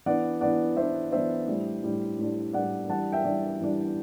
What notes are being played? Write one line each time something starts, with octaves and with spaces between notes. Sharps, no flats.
E3 B3 D4 D5 F#5
E3 B3 D4 D5 F#5
E3 B3 D4 C5 E5
E3 B3 D4 C5 E5
A2 G3 D4
A2 G3 D4
A2 G3 D4
A2 G3 D4 D5 F#5
E3 G3 D4 F#5 A5
E5 G5
E3 G3 D4
E3 G3 D4